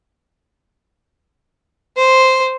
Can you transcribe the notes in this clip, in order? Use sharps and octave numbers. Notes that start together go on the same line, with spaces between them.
C5